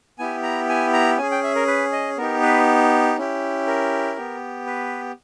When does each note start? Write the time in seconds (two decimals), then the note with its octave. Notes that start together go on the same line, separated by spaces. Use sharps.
0.19 B3 E4 G4 G#5
0.43 A#5
0.69 G#5
0.93 A#5
1.18 C#4 G#4 G#5
1.31 G5
1.43 E5
1.55 A#4
1.67 B4
1.92 D#5
2.18 B3 D#4 G4 A#4
2.42 B4
3.17 C#4 E4 G4
3.67 A#4
4.16 B3 G4
4.66 B4